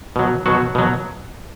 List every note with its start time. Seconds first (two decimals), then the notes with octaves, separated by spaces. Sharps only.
0.16 B2 F#3
0.46 B2 F#3 F#4
0.75 B2 F#3